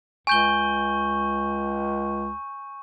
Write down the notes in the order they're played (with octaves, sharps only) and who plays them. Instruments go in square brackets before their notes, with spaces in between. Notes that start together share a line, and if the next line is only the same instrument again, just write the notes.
[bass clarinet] C#2 [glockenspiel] G#5 G6 G7 [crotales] C#6